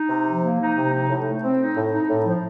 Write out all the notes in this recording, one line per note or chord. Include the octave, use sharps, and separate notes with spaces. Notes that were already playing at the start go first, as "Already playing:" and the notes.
Already playing: D#4
C3
F3
A#3
D#4
C3
D#4
A2
A3
C4
D#4
A2
D#4
A2
F3